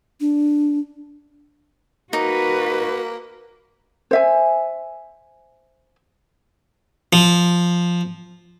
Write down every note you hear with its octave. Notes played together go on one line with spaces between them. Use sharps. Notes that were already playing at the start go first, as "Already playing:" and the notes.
D4
A#3 D#4 F#4 B4
C5 E5 G#5
F3